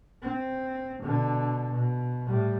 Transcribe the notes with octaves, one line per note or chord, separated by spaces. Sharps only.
C4
B2 D3
B2
A2 G3